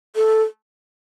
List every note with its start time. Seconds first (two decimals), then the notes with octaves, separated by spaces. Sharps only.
0.16 A4